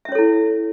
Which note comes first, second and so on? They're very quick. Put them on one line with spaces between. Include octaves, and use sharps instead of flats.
E5 C#4 C#5 A4 E4